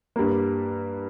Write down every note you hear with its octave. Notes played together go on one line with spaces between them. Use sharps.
G2 G3 A#3